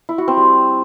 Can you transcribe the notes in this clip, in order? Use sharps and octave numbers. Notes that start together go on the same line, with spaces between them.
E4
F#4
C4
G3